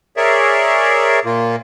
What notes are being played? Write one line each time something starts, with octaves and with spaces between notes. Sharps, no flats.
G#4 A#4 C#5 D5 E5
A#2 A#3 F4